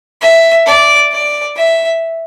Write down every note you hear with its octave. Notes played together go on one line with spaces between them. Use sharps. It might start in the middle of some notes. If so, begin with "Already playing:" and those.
E5
D5
D5
E5